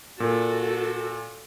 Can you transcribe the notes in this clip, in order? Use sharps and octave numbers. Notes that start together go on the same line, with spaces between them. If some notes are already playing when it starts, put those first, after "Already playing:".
A#2 F#4 A4